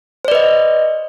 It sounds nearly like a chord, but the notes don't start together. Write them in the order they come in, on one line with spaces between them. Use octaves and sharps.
C5 D5 B4 D#5